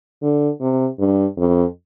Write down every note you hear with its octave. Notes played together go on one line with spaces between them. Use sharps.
D3
C3
G2
F2